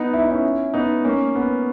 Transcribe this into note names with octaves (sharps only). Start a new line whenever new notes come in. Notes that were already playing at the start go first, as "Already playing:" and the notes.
Already playing: B3 D#4
E4
D#4
C#4 E4
B3 D#4
A#3 C#4
B3